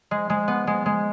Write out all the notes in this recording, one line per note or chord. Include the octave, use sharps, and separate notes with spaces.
G#3
G#3
B3
G#3
G#3